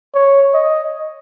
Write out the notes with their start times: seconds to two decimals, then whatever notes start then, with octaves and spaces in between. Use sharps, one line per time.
0.15 C#5
0.54 D#5